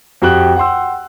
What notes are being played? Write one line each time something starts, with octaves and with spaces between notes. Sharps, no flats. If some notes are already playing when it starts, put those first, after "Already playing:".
F2 F#4 G4 G5 F#6 F#7
F#5 G5 C6 E6